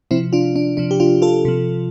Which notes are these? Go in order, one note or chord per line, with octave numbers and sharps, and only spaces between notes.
C3 F3 C4 E4
D4 F4
D4
C3 F3 D4
G4
D4 F4
F4 A4
C3 F3